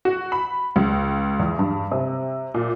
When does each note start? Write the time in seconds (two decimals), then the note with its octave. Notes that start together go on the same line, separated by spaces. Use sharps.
0.05 F#4
0.32 B5
0.76 C#2
1.39 E2
1.59 G2
1.92 C3
2.54 A#2